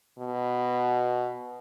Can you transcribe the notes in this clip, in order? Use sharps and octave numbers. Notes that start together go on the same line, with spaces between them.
B2